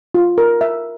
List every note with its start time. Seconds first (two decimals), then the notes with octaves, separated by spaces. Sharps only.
0.15 F4
0.38 A#4
0.61 E5